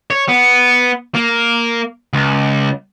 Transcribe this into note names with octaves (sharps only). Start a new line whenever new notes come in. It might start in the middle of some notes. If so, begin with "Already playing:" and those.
C#5
B3
A#3
C#2